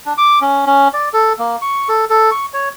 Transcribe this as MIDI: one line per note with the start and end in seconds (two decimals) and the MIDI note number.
0.06 0.13 62
0.18 0.39 86
0.41 0.66 61
0.66 0.88 61
0.93 1.09 74
1.13 1.33 69
1.39 1.56 58
1.62 1.89 85
1.89 2.05 69
2.10 2.30 69
2.31 2.46 85
2.53 2.69 73